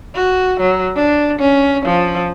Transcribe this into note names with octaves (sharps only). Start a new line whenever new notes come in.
F#4
F#3
D4
C#4
F3